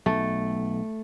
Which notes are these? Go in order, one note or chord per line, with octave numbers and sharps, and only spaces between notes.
B1 A3